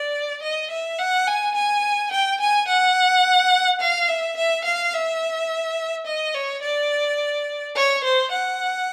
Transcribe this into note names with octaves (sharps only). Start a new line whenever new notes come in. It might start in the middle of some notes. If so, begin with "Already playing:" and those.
Already playing: D5
D#5
E5
F#5
G#5
G#5
G5
G#5
F#5
F5
E5
E5
F5
E5
D#5
C#5
D5
C#5
C5
F#5